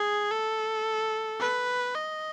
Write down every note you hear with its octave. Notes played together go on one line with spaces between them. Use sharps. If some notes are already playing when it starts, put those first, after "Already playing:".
Already playing: G#4
A4
B4
D#5